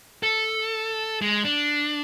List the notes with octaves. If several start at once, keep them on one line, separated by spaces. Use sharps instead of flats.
A4
G#3
D4